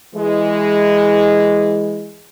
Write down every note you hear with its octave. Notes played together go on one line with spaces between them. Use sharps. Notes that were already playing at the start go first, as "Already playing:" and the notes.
E3 G#3